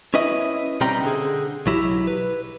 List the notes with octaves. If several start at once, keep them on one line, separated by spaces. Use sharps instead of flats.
C#4 E4 B4 D#5 E5
B2 G3 C4 C#4 G5 A#5
D3 G#4
B1 F#3 E4 G4
B4